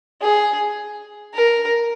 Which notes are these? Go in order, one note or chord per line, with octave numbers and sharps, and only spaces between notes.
G#4
A#4